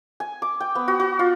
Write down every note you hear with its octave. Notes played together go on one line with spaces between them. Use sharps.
G#5
D6
G5
B3
F#4
F#4
F4